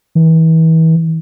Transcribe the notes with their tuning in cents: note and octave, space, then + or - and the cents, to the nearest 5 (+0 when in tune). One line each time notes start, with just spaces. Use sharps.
E3 -35